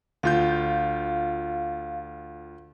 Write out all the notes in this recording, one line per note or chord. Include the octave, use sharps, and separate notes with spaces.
D2 F4 F5 G6